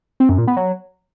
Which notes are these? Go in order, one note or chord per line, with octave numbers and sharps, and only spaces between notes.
C4
F#2
A#2
B3
F#3